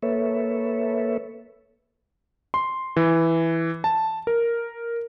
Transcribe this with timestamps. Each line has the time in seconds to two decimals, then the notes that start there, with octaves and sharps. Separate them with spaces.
0.02 A#3 A4 B4 C#5 E5
2.54 C6
2.96 E3
3.84 A5
4.27 A#4